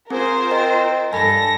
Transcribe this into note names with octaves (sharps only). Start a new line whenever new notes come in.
C4 F4 G#4 A#4 C5
C4 D#5
G2 A4 G#5 B5 A#6